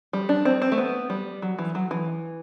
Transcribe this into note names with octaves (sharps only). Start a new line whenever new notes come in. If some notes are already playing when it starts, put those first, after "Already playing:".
G3
D4
C4
C4
A3
B3
G3
F#3
E3
F#3
E3